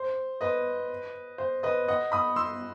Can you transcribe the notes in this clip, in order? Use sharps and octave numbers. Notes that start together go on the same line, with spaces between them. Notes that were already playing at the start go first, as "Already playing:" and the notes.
Already playing: C5
B4 D#5
C5
B4 D#5
D#5 F#5
B5 D#6
C6 E6